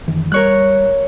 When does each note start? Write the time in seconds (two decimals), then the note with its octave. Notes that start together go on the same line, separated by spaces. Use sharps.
0.08 F#2 D#3 E3
0.32 G3 A#4 C#5 F#6